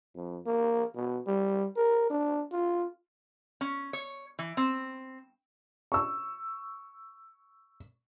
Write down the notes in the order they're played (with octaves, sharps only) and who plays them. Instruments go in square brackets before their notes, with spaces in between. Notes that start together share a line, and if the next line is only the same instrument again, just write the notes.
[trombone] F2
A#3
B2
G3
A#4
D4
F4
[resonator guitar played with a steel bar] C#4
C#5
E3
C4
[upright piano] C#6 E6